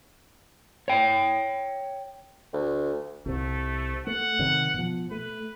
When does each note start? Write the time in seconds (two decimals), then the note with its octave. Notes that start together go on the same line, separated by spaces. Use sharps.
0.88 C#5 G5
2.53 D2
3.26 C2 C3 A3
4.07 A3 F#5
4.39 C3 D#3 F#3
4.74 B2 F3
5.11 A3 B4